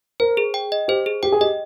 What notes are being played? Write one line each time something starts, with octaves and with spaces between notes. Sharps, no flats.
A#4 C5
G#4
G5
D#5
G4 C5
G#4
G4 G5
G#4
G4 D#5